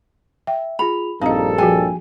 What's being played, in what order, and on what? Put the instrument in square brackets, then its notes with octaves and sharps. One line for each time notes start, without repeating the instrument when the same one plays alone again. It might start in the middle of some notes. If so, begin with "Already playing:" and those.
[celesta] E5 [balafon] G5
[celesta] F4 G#4 F7 [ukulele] B5
[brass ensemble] A#1 G2 A4 [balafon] C4 D#5 [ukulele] D#4 [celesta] F5 A#5
[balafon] F3 F#4 G#4 [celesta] G5 [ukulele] G#5